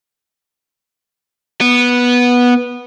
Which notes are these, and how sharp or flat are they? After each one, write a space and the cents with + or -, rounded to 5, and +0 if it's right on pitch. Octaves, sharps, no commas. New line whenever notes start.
B3 -10